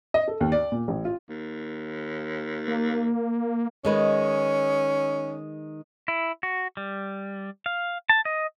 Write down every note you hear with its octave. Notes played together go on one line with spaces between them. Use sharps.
D#5
A4
D#2
D5
A#2
A1
F4
D#2
A#3
D#3 G#3 C#4 B4
E4
F#4
G3
F5
A5
D#5